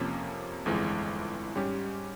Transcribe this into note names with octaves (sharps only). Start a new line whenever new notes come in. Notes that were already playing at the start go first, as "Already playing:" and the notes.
Already playing: F2 C3 F3 A#3 C#4
G1 F2 E3 G#3
G#2 G3 C#4 G4